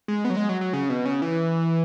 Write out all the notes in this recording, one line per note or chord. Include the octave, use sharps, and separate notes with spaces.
G#3
B3
F#3
G#3
F#3
F#3
C#3
B2
C#3
E3